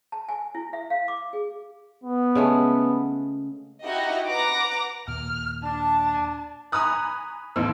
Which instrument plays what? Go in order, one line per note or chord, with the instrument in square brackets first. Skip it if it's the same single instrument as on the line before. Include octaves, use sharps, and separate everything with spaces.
[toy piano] A5
G#5
E4
E5
F5
D6
G#4
[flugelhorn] B3
[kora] C#3 G#3 A3
[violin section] D#4 E4 F#4 G4 D#5
B4 F#5 A#5 D6 A#6
[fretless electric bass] D#2 A#2 [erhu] F6
[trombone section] D4 [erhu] A5
[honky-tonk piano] G#5 A#5 B5 C#6 D#6 F#6
A1 D#2 A2 E6